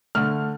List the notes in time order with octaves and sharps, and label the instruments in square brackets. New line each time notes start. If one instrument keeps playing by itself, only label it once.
[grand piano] D3 A3 F6